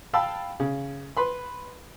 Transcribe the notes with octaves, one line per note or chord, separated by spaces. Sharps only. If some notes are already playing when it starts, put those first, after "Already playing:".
F5 G5 A5 B5 E6
C#3
B4 B5 C6